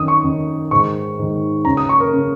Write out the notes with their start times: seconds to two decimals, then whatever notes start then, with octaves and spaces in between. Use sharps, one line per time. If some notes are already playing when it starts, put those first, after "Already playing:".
Already playing: F#2 D#3 D#6
0.08 C#6
0.24 F#2 D#3
0.71 G#2 D#3 C#6
1.19 G#2 D#3
1.65 F#2 C#3 A#5
1.77 D#6
1.89 C#6
2.00 A#4
2.13 C#3